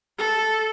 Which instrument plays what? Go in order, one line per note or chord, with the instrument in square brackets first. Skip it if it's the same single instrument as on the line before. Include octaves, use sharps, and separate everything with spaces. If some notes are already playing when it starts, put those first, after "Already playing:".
[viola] A4